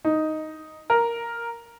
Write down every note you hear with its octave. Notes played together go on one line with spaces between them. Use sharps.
D#4
A#4